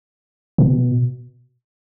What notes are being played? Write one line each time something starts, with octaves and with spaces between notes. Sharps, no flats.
B2